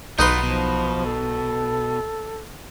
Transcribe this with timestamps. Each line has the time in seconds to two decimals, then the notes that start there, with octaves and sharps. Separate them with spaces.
0.19 B1 B3 D#4 F4 B4 C6
0.43 B2 F3
1.05 A4